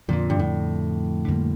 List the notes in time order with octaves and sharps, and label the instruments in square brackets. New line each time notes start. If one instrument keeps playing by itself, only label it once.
[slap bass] F2 D3 F3 [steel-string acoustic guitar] A#2
[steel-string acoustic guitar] G2
A2
[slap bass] F2 D3 G3 A#3